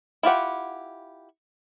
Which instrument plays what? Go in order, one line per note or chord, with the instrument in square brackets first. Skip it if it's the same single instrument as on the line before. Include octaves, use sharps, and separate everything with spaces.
[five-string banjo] E4 F4 G4 F#5